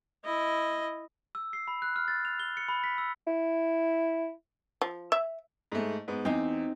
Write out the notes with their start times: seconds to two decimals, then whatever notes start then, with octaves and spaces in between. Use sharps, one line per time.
0.25 E4 D#5
1.35 E6
1.53 C7
1.68 B5
1.82 F#6
1.96 F6
2.08 A6
2.25 F7
2.40 G7
2.57 C#7
2.68 B5
2.84 B6
2.98 E6
3.27 E4
4.81 F3
5.12 E5
5.72 G#2 A3
6.08 G#2 B3
6.25 E2 C4 D#4